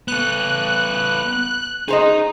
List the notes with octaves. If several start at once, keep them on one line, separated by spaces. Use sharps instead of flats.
B3 A4 F#6
D#4 G#4 C5 D#5 A#5